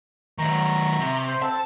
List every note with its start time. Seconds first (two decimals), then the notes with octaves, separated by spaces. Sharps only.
0.38 D#3 F#3 A#5 C#6
0.99 C3
1.28 C5 C6
1.42 C4 A4 A5